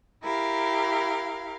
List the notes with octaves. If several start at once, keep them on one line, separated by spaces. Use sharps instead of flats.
E4 G4 A#4 F5